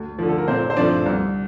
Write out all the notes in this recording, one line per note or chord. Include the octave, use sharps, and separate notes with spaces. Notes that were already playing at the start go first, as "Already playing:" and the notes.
Already playing: D2
D3 F3
A4
A#4
A#2 C4 C5
C5
F3 A3 C4 D4 D5
C2